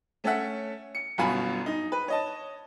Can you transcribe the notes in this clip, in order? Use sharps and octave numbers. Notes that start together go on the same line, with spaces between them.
A3 C#4 A4 C#5 E5 F#5
C#7
G1 F#2 B2 F5 G#5 B5
D#4
B4
C#5 D#5 A5